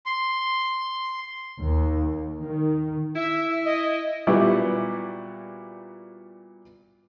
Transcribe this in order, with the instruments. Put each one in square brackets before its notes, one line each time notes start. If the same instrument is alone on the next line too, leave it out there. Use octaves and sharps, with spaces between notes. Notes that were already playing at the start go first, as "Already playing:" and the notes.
[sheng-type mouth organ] C6
[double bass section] D#2
D#3
[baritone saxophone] E4 [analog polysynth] E5
[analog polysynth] D#5
[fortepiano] A#2 G3 B3 E4 F#4 G4